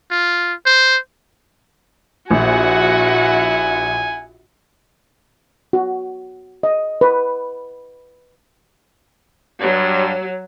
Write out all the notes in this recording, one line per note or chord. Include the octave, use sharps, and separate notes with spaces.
F4
C5
A#1 E4 F#4 F#5 G#5
F#4
D#5
B4
G2 F#3